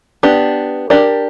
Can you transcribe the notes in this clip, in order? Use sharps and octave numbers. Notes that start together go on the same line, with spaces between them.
B3 D4 G4
D4 G4 A#4 D5